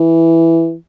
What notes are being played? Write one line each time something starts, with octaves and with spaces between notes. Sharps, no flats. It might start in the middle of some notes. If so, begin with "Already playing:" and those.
Already playing: E3